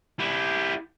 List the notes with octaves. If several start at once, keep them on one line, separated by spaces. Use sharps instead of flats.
E4 G4